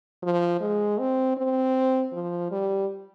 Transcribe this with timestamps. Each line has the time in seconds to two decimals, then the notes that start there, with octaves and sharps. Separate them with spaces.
0.23 F3
0.61 G#3
0.99 C4
1.37 C4
2.13 F3
2.52 G3